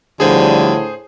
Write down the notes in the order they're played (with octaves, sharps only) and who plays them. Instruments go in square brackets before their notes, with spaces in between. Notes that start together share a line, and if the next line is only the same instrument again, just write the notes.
[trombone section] D2 F3 G3 [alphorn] A2 [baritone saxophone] D3 [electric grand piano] G#4 C5